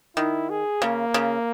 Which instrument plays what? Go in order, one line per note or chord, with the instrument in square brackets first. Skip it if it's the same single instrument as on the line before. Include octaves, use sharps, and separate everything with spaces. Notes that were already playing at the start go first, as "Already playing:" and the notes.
[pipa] D#3 [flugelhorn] E4
[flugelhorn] G#4
[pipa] C#3 [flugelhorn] A#3
[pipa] C#3